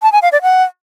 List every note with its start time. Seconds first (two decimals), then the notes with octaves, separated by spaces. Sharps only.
0.02 A5
0.12 G#5
0.22 F5
0.32 D5
0.42 F#5